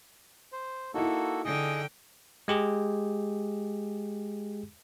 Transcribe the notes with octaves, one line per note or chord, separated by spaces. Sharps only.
C5
A#3 D#4 E4 F#4 A4
D3 G#4 D#5 G5
G#3 G4 G#4